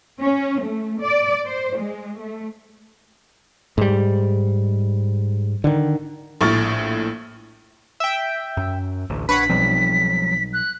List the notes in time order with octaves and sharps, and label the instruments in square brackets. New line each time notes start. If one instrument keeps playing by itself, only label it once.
[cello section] C#4
A3
D5
C5
G#3
A3
[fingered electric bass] G#2 G3
D3 D#3
[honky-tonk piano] A#1 A2 C#6 F6 A6
[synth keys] E5 G5
[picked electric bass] F#2
A1 D2
[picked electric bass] A#1 D4 [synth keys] B4 C#5 F#5 [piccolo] B6
[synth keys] B1 [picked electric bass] F3 G3 C4
[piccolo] F#6